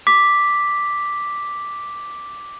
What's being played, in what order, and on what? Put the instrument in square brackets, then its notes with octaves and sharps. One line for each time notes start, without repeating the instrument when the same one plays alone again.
[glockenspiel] D6 B6